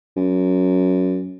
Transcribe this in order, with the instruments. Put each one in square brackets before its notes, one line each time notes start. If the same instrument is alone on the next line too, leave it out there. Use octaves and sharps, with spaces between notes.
[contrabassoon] F#2